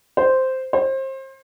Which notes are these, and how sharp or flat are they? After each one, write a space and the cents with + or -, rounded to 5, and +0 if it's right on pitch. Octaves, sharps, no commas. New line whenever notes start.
C5 -5
C5 +30